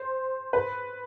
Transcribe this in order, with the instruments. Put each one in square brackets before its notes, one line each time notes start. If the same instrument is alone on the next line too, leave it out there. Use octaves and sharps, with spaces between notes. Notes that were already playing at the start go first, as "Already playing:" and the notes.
Already playing: [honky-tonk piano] C5
B4